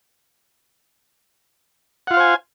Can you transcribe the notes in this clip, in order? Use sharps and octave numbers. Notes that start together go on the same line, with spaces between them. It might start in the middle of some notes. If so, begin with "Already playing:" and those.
F4 C5 F5 F#5 G#5